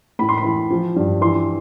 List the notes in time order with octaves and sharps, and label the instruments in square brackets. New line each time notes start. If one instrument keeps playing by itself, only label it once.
[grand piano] A2 B5
C6
B5
E3
F3
G2
E3 C6